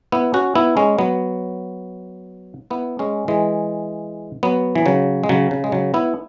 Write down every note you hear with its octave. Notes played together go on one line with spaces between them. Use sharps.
B3 E4
C#4 F#4
B3 E4
G#3 C#4
F#3 B3
B3 E4
G#3 C#4
E3 G#3
F#3 B3
E3
C#3 F#3
G#3
C#3 F#3
C#3
G#3
C#3 F#3
B3 E4